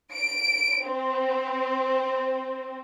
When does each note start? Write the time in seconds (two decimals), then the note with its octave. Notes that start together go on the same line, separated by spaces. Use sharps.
0.16 D7
0.86 C4